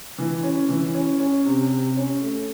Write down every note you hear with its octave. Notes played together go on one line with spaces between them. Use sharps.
E3
C#4
E3
C#4
C#4
C3
C3
C#4
A3